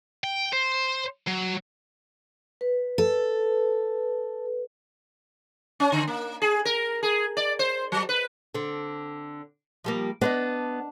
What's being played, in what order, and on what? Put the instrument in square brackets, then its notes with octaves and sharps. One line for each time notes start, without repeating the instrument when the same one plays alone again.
[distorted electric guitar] G5
C5
F#3
[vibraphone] B4
[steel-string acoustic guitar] A4
[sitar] C#4
D3
A#3
G#4
A#4
G#4
D5
C5
F#3
B4
[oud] D3 C4
F3 G3 A#3
[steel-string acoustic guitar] B3 [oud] D4 C5 D#5